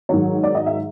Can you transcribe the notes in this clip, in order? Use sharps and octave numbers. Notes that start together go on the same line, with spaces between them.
G#2 D#3 F#3 C#5
D5
D#5
E5